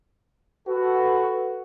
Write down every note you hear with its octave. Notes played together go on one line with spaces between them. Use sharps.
F#4 A4 B4